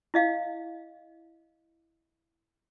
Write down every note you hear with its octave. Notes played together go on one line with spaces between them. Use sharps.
E4 D#5 F5